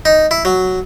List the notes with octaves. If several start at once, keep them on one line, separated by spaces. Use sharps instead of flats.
D#4
E4
F#3